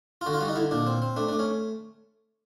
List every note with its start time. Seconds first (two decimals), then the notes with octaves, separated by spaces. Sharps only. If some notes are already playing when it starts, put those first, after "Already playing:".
0.21 F4
0.26 D3 F#4
0.33 F4
0.41 G3 F#4
0.48 D#4
0.56 D3 E4
0.71 A#2 D4
0.87 C4
1.02 C4
1.16 A3 D4
1.28 D4
1.32 A3
1.39 C#4